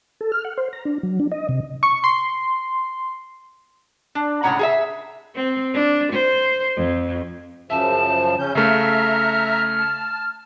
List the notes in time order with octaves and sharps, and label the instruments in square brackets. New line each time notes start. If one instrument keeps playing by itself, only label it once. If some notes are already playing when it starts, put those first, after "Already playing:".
[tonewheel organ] A4
F6
F#5
C5
A#5
D4
F#3
D4
D#5
C3
[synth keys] C#6
C6
[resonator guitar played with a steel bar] D4
A2 C#3 G#3 C#4 F#5 A#5
G#4 A4 E5
[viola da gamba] C4
D4
C5
F2
[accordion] F#2 C#3 F3 [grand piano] E5 [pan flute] A5
[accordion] C#3 C#4 G6
[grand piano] C#3 A3 [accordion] E5 A#5 [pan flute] F6
[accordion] A5